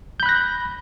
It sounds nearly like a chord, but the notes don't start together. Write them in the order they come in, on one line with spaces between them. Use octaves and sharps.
G6 B5 F#6 A#6